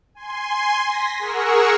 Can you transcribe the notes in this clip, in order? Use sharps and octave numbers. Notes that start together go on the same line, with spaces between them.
G#5 C6
A#6 B6
G#4 A#4 F#5 C#6 E6